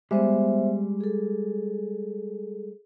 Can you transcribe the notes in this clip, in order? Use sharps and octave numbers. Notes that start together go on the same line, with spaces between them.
G3 G#3 B3 C5 E5
G#4 A4